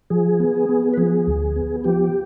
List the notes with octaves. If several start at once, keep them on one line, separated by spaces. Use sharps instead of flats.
F3 G#4
B3
B3
B4
F3 G#4
D2
B3
F3 G4